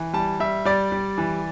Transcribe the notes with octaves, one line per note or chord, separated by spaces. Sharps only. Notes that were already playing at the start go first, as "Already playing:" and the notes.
Already playing: E3
G3 A5
G3 E5
G3 D5
G3
E3